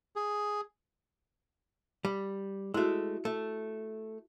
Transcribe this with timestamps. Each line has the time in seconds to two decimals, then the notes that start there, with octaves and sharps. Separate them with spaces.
0.16 G#4
2.05 G3
2.74 G#3 A3 E4 F#4
3.25 A3